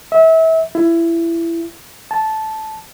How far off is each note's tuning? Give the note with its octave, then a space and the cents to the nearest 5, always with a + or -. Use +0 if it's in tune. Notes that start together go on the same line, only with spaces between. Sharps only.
E5 -30
E4 +20
A5 -10